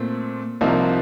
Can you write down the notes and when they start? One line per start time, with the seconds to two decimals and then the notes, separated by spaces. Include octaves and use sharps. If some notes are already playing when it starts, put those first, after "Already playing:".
Already playing: A#2 A3 C4
0.61 C2 C3 F3 A#3 D#4